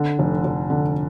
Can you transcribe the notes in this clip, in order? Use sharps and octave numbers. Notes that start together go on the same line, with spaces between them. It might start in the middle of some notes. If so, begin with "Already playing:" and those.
Already playing: D3
F1
F1
D3